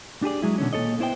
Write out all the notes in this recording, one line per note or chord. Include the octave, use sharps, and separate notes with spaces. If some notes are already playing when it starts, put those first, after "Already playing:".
D4 G4 G#4 D5
F#3 G#3 E4
B2 D3 D#3 C#4
A#2 E3 A4 C#5 D#5
B3 E4 C5 D5 G5